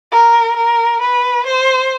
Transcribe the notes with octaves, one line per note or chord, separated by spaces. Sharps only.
A#4
A#4
B4
C5